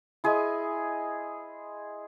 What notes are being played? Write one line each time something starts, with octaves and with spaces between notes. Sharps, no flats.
E4 G#4 C5 D#5